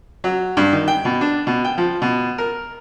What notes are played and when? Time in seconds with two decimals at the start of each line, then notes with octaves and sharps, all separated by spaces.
0.24 F#3
0.57 G2
0.73 D#3
0.88 G5
1.05 B2
1.21 D4
1.47 B2
1.65 G5
1.78 F3
2.02 B2
2.38 A#4